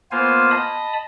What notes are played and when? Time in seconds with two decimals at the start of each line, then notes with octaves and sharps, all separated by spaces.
0.12 A#3 B3 F4 C5 F5 G#5
0.51 D#5 A5 B5 D#6